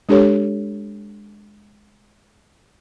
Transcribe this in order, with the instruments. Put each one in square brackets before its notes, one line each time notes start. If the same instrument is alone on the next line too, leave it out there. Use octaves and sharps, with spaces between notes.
[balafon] G#3 D4 G4 A4 C#5